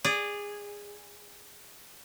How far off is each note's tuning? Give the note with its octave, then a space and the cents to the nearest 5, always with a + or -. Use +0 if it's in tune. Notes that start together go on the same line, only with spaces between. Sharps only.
G#4 -15 D5 +0